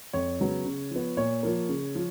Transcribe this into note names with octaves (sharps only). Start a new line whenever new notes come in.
F2 C#5
C#3 F#3 B3
C#3
F3 B3
A#2 C#5
F3 A#3
C#3
F3